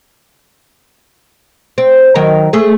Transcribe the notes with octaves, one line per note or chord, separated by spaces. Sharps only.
C4
D#3 F#3 A#4
A3 G#4